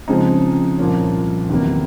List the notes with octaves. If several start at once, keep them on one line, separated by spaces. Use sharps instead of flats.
C#3 F3 G#3 C4 D#4
C2 A#2 F3 A#3 C#4
E2 C3 D#3 F#3 A#3